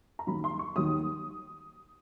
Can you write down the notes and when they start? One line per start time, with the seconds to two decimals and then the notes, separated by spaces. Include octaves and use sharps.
0.19 A#5
0.27 D#2 D#3 F#3 B5
0.44 C6
0.59 C#6
0.76 D#2 D#3 F#3 D#6